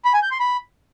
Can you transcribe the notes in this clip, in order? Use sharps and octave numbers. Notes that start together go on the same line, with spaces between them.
B5
G#5
G6
C6
B5